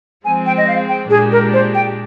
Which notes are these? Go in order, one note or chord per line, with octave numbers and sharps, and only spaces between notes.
F3 G#3 C4 G#5
G5
D#5
F5
G5
A#2 G#3 D4 G4 G#4
A#4
C5
G5